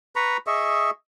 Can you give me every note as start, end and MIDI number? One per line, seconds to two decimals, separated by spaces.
0.16 0.37 71
0.16 0.37 82
0.16 0.37 83
0.16 0.37 85
0.47 0.90 68
0.47 0.90 75
0.47 0.90 76
0.47 0.90 85